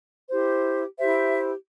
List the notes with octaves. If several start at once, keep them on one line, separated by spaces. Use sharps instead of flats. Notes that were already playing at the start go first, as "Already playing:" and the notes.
E4 G4 C5
E4 G4 C5 E5